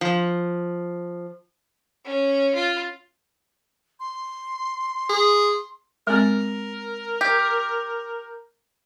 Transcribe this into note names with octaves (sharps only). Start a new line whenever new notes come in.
F3
C#4
F4
C6
G#4
G#3 C4 A#4
G4